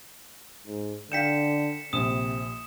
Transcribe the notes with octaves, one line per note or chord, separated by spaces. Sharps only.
G#2
D3 F5 G5 G6 B6 C#7 E7
A#1 C3 D#6 E7